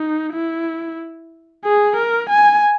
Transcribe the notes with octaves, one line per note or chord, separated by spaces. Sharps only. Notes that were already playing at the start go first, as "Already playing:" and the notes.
Already playing: D#4
E4
G#4
A#4
G#5